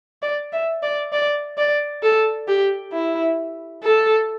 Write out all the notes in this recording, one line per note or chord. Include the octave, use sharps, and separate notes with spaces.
D5
E5
D5
D5
D5
A4
G4
E4
A4